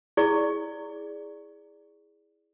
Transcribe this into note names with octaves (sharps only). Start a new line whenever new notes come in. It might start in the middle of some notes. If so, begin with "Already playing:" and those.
E4 G#4 D5 C#6